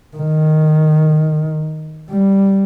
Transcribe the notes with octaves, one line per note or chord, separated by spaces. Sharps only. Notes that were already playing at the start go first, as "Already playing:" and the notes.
D#3
G3